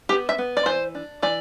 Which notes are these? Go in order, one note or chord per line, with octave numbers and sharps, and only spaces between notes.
B3 G4
E5
B3
D5
E3 C5
D4
E3 D5